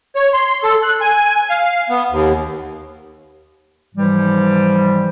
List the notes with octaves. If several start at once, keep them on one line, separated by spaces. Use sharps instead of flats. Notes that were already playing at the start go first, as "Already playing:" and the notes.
C#5
C6
A4
F#6
G#5
F5
B3
D#2
G#2 E3 F3 G3